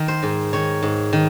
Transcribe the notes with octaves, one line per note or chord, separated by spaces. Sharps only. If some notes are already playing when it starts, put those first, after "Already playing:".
Already playing: D#3 A#4
C5
G#2
D#3 C#5
G#2
D#3